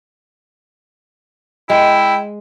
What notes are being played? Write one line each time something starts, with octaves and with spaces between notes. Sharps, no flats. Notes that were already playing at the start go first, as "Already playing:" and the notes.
G#3 E4 G5